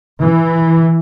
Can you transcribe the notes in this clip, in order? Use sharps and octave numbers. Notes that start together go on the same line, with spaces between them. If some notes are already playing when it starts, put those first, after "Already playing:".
E3